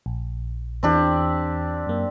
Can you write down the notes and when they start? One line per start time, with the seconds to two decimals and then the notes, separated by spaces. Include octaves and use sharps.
0.06 A#1
0.83 E2 E3 C4 D4 G4
1.87 F#2 A#3